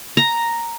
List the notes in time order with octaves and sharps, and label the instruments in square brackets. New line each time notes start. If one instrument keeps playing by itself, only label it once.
[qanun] A#5